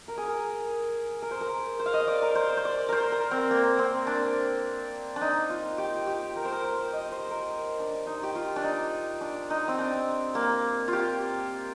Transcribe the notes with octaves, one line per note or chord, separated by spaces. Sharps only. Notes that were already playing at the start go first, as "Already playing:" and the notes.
A#4
G#4
A#4
A#4
C5
A#4
C5
F5
D#5
D5
A#4
C5
C5
D5
A#4 C5
A#4
C4
A#3
C4
D4
D4
D#4
F4
G4
G4
A#4
C5
A#4
C5
D#5
C5
A#4
D4
D#4
G4
F4
D4
D#4
D4
D#4
C4
D4
A#3
F4
G4